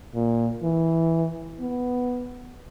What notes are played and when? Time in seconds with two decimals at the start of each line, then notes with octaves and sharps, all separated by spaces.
0.15 A#2
0.63 E3
1.60 B3